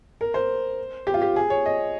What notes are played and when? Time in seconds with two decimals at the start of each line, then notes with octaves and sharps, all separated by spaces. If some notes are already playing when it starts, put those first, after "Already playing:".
0.21 A#4
0.34 C5
1.07 G4
1.14 F4
1.22 G4
1.36 G#4
1.50 C#5
1.66 D#5